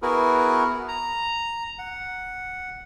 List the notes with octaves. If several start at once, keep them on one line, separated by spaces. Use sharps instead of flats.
B3 E4 F#4 G#4 A#4 B4
A#5
F#5